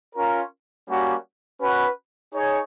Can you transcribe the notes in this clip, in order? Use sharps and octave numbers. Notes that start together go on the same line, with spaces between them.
C#4 F4 A#4
G3 A#3 C#4 F#4
C#4 F#4 B4
D#4 G#4 C#5